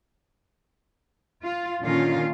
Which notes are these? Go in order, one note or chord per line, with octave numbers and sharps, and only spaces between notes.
F4
A#2 D3 D#3 C#4 F4